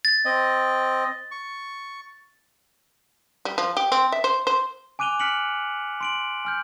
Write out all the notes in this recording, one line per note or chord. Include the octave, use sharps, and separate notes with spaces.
A6
C4 D#5
C#6
G3
F3
G4
C4
E5
C5
C5
G#5 D6 F#6 D#7 F7 G7
F6 F#6 B6 C#7 D7 F#7
C6 D7 F#7
G#5 F6 G6